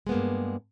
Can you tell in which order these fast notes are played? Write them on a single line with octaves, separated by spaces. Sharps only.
G#3 B3 A#3 G2